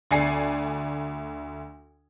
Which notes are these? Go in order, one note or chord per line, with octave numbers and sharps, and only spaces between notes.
D2 D5 G#5 C7 C#7